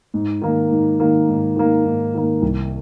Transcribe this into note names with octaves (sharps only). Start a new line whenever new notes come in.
G#2
D#3 A#3
G#2
D#3 A#3
G#2
D#3 A#3
G#2
D#3 A#3
C2